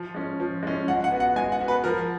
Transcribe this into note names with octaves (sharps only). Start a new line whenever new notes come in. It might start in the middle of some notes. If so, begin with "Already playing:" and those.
Already playing: F3
G#3 C#4
F3
G#3 C#4
G#3 F#5
F#5
B3 F#4
F#5
G#3 G#5
F#5
B3 F#4
B4
F3 A#4